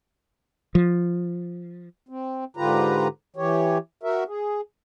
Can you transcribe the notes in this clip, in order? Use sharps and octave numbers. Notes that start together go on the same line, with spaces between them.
F3
C4
G#2 D3 F4 G4 B4 A#5
E3 G4 C#5
F#4 A#4 E5
G#4